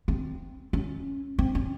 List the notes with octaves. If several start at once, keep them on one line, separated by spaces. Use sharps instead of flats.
C4
C#4
C4
C#4